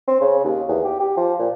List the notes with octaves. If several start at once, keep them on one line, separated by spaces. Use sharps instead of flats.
C4
C#3
D#2
E2
G4
G4
F3
A#2